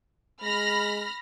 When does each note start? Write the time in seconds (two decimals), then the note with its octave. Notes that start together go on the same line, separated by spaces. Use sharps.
0.42 G#3 B5 F6 A#6